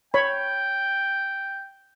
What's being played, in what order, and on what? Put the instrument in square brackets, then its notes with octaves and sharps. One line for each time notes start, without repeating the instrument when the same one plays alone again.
[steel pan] C#5 B5 [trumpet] G5